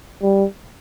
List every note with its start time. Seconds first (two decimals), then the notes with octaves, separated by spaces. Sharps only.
0.22 G3